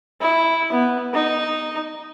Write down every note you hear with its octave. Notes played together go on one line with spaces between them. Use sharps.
E4
B3
D#4